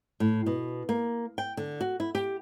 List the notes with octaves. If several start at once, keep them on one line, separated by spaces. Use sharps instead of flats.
A2
B2
A#3
G5
D3
F#4
E4
G4